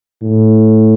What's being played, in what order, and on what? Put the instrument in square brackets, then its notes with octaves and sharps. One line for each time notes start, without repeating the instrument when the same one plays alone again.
[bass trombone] A2